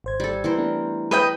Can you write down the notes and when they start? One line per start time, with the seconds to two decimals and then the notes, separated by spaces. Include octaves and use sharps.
0.04 G#1 C5 G#6
0.20 G3 A4
0.44 E3 A#4 C5
0.56 A3 B3 D4
1.11 B4 D#5 G5